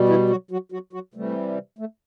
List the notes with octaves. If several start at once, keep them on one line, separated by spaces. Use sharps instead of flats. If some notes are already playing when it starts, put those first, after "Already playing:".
Already playing: B2 G3
E3 E4
F#3 F#4
F#3 F#4
F#3 F#4
F#3 F#4
C3 E3 G3 A3
A3